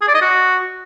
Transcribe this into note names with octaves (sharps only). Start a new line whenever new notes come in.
G#4
D5
D#5
F#4